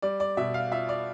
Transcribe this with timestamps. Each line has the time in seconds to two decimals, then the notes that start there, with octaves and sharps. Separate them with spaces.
0.02 G3 D5
0.20 D5
0.37 B2 E5
0.54 F5
0.71 F4 E5
0.89 D5